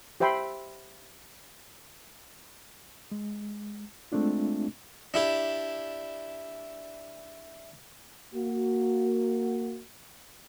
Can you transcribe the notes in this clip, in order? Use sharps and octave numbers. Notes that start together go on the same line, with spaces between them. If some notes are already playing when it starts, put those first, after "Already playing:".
G4 C5 E5 G5 B5 C6
G#3
G#3 A3 C4 D4 F4
D4 E4 G4
A#3 F#4